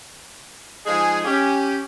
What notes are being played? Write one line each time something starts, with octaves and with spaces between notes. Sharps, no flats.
F3 G#3 D#4 G#4
C#4 G4